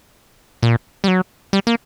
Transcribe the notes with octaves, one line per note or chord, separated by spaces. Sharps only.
A#2
G3
F#3
G3
A#3